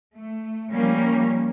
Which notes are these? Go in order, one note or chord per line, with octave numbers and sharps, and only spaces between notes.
A3
F3 G3 A#3 C#4